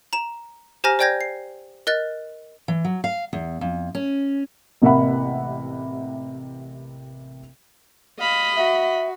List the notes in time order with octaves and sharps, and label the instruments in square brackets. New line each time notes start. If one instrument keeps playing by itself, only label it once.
[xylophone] A#5 E7
G4 C5 G#5 A#5 F6 A#6
C5 D5 G5 G6 G#6 A#6
C7
A#4 D#5 F#6 A6
[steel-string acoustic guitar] E3
F#3
F5
E2
F2
C#4
[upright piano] A1 C3 A#3 E5 F#5 B5
[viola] D#5 B5 [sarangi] F5
[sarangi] F#4 [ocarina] E5